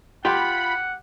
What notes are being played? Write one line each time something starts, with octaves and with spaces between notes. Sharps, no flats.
F4 G4 F#5 B5